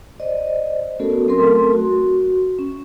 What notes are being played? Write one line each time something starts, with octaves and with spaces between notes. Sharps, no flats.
C5 D5 D#5
A3 B3 C#4 F#4 A4 A#4
F#3 A3 C4 A4 A#4 C6
F#4
C#4